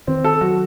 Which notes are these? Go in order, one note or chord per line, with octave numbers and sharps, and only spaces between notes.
D#3 C4
A4
F#3 F#4